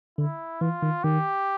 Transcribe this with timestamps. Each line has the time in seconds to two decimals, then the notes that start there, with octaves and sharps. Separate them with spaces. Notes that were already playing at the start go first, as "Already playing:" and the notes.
0.18 D3 E4
0.61 E3 F4
0.82 D#3
1.04 D#3 G4